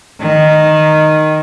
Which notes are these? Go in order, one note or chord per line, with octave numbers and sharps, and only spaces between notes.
D#3